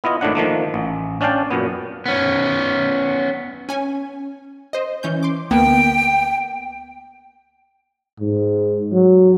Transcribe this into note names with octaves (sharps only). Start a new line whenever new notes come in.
B3 E4 F4 D#5
G#1 A2 D#3 D4 F#5
D#3 F3 A3 A#3
A1
C#4 D4 D5 F5 G5 A5
F#2 A#2 B3
B3 C#4
C#4 G#5
C5 D#5
E3 C#4 G6
C6 D6
D2 A#3 B3 G5
G#2
F#3